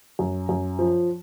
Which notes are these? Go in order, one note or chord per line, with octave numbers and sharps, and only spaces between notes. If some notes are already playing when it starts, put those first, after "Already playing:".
F#2
F#2
F3